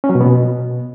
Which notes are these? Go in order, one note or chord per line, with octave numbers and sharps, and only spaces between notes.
C#4
F#3
B2
B3
B2